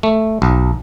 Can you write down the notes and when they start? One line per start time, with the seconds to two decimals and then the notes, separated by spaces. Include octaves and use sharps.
0.03 A3
0.42 B1